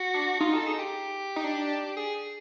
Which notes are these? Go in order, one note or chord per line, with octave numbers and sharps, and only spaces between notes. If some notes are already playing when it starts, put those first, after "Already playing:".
Already playing: F#4
D4
D#4 F4
A4
G#4
G4
D#4
D4
G#4